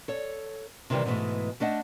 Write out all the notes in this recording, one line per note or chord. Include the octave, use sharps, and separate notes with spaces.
A4 C#5
C3 D#3 E3 G3 D#4
G#2 B2 E3 F#3 G#3 A3
A3 D4 D#5 F#5